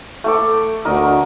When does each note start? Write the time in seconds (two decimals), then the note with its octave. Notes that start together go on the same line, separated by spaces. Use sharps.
0.24 A3 A4 D6
0.85 D2 D4 F#4 A#4 D#5